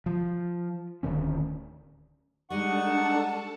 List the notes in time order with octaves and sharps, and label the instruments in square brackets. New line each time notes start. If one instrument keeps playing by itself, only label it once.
[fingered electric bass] F3
D1 D2 D#3 C#4
[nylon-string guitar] G3 G#3 [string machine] D4 A4 A5 [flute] D#4 [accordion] F#5 C#6